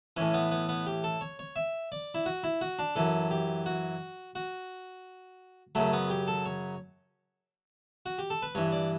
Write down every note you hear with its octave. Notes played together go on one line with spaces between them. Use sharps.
A2 E3 C#4
B3
B3
B3
G4
A4
C#5
C#5
E5
D5
E4
F#4
E4
F#4
D4
F#2 E3 A4
G4
F#4
F#4
F#2 C#3 F#3 A3
B3
G4
A4
C#5
F#4
G4
A4
B4
G2 E3 C#5
D5